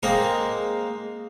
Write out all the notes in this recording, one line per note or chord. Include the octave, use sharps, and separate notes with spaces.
G#3 A#3 C4 D#4 A#4